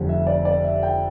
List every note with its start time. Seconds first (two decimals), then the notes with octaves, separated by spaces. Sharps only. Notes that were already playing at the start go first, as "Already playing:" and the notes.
Already playing: F1 F2 D3 G3
0.09 E5
0.27 D5
0.45 D5
0.64 E5
0.83 G5